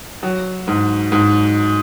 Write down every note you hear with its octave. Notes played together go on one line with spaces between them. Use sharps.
F#3
G#2
G#2